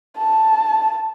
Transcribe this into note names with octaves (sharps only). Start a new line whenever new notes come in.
A5